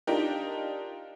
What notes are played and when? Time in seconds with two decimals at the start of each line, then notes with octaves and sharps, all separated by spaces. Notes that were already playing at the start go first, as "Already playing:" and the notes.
0.07 D4 D#4 F4 G4 A#4